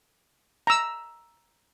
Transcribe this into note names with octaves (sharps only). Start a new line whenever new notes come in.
A#5 E6